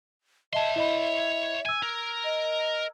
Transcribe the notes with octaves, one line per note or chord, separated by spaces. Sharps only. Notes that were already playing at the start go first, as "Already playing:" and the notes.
C#5 D#5 E5 A5 C6
E4 D#5 B5
G#5 E6 G#6
A#4
D#5